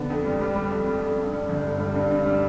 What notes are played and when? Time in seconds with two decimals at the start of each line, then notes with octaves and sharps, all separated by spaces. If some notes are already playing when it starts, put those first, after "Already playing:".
Already playing: D3 B3
0.10 F2
0.25 G3
0.41 G3
0.56 G3
0.71 F2
0.87 G3
1.03 F2
1.18 G2
1.33 G3
1.49 G1
1.65 G2
1.80 G3
1.95 G2
2.11 G2
2.26 G3